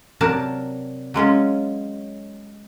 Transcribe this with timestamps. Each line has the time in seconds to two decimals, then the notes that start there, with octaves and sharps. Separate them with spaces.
0.21 C3 F#3 D4 A#4 A5
1.14 F#3 G#3 C#4 F4